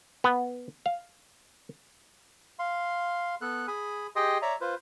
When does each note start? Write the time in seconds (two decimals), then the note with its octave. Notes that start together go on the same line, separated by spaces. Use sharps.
0.24 B3
0.86 F5
2.59 F5 C6
3.41 B3 A4 F#6
3.68 G#4 G#5 B5
4.16 G4 G#4 D#5 G5 C6 D#6
4.42 C#5 D5 E5 A#5
4.61 F4 B4 C5